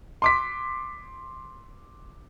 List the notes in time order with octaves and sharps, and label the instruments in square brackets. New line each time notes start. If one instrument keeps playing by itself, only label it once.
[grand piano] C6 D6 B6